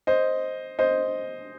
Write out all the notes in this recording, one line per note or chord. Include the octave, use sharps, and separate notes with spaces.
C5 D#5
C5 D#5